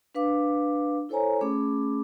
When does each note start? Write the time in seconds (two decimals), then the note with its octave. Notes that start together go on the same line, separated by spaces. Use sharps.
0.15 D4 B4 F5 D6
1.09 E4 A4 C5 C#5 G#5 A#5
1.41 A3 C#4 G#4 B5 D6